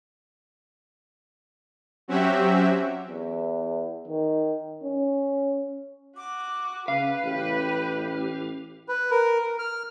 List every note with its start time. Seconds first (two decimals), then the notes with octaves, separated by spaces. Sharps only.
2.08 F#3 C4 C#4 F#4 G4 E5
3.08 E2
4.07 D#3
4.83 C#4
6.17 F#4 D6
6.88 C#3 B4 F5
7.24 A1 G4
8.88 B4
9.11 A#4
9.44 A#4
9.59 F6